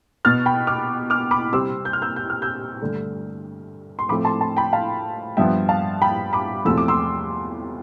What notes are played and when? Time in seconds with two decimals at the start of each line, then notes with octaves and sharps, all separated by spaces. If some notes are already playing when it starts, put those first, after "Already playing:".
0.25 B2 B3 F6 A6
0.46 G5 B5
0.67 D6 F6
1.10 D6 F6
1.31 B5 D6
1.52 C3 G3 C4 C6 E6
1.85 G6
1.93 F6
2.02 E6 G6
2.16 G6
2.30 F6
2.42 E6 G6
2.82 G2 D3 A3
3.99 C6
4.09 A2 F3 A3 C4 B5 D6
4.25 A5 C6
4.41 A5 C6
4.57 G5 B5
4.73 F5 A5
5.37 G2 F3 B3 E5 G5
5.69 F5 A5
6.02 G5 B5
6.33 B5 D6
6.65 E2 C3 F3 A3 E6
6.78 D6
6.88 C6 E6